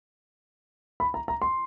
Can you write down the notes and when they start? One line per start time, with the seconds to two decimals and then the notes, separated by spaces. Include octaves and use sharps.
1.00 B5
1.14 A#5
1.28 A#5
1.42 C6